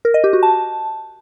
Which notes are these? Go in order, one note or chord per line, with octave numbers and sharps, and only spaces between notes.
A#4
D#5
G4
F#4
A5